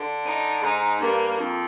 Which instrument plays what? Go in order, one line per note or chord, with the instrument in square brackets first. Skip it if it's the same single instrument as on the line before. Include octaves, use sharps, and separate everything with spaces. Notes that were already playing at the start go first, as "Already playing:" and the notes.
Already playing: [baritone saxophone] D3
[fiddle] D#4
[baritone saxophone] G#2 [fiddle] D#4
[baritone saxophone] G2 [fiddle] A#3
[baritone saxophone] F2